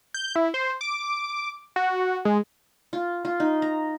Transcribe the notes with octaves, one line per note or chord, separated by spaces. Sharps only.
G6
E4
C5
D6
F#4
G#3
F4
F4
D#4
A#5